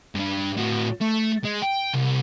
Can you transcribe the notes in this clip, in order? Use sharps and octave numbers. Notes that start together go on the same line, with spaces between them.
G2 D4
A2 F#4
A3
G#3
G5
C2